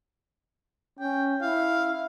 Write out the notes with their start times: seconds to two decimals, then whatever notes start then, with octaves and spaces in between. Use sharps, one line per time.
1.00 C#4 G5
1.42 E4 F5